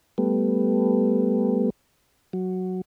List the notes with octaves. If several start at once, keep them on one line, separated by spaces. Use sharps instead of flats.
G3 A3 B3
F#3